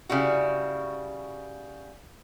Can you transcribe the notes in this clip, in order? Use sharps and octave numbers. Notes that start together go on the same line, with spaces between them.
C#3 G3 E4 F#4